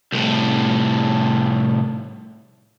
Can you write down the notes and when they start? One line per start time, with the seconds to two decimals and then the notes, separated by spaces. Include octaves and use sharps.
0.12 C2 A2